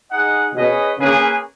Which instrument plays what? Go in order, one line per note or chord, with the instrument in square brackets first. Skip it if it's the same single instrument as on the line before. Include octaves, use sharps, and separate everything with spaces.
[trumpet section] D#4 G#4 D#5 F#5
[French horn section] B2 [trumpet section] C#4 G#4 B4 D#5
[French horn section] C#3 [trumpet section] A#3 C#4 G#4 B4